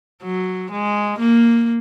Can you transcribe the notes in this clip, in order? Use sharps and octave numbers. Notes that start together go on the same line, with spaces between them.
F#3
G#3
A#3